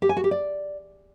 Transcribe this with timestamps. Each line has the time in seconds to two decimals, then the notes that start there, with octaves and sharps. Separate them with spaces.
0.02 G4
0.09 G#5
0.17 F#4
0.24 G4
0.31 D5